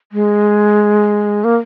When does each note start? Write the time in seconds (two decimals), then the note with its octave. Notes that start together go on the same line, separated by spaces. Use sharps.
0.12 G#3
1.44 A#3